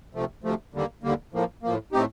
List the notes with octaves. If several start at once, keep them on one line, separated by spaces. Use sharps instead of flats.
D2 C3 F3 A3
D2 C3 F3 A3
D#2 D3 G3 A#3
D#2 D3 G3 A#3
A2 F3 A#3
A2 F3 A#3
A2 A3 C4 D#4 G4